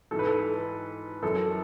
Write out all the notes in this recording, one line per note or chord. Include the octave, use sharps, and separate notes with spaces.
G#2 E3 A4
B4
A4
F#2 E3 A4